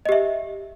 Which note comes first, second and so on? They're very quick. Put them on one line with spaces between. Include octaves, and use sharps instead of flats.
D#5 G4 E5